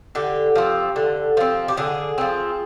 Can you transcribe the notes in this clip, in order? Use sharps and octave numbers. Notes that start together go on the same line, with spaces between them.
D3 G4
F3 C4
D3
F3 C4
G4
D3 G#4
F3 C4